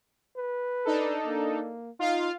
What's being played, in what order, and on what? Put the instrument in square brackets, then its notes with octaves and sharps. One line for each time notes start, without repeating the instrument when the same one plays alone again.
[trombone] B4
[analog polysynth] D4 D#4 A4
[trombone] A#3
[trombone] D#4 [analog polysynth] F4 F5